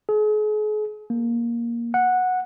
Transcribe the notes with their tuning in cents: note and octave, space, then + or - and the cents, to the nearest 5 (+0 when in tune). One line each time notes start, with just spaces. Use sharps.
G#4 +40
A#3 +10
F#5 -10